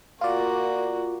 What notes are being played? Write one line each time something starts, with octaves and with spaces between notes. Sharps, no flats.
A#3 F4 F#4 D5